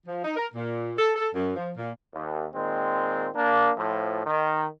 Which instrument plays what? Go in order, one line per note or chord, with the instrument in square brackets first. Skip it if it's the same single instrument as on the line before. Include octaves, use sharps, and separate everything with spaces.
[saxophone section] F3
D#4
A#4
A#2
A4
A4
F#2
F3
A#2
[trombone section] D#2
A#2 D#3 G#3 C4
A#3 D4
A2 F3
D#3